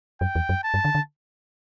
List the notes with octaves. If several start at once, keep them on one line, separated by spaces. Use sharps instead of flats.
F#2 G5
E2
F#2
A5
G2
D3
D3